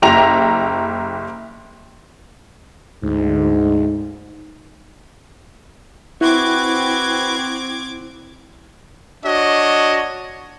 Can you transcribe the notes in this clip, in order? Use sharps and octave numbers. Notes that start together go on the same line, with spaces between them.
F#1 G4 E5 A#5 A#6 F7
D2 G#2
C4 E4 F#4 B4 D6 G#6
D4 F#4 C#5 D#5